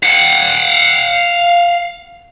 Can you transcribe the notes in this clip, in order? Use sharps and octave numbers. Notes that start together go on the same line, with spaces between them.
F5 F#5